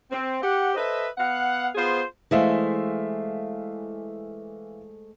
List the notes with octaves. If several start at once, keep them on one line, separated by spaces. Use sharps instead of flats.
C4
G4 F#5
A4 B4 C5 D#5 E5
B3 F5 F#5
B3 F4 G#4 C5
E3 G#3 A3 C5 E5 F5